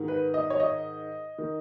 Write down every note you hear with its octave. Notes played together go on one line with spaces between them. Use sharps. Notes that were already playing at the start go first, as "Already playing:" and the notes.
Already playing: G#2 D#3
B4
D#5
C#5
D#5
D#3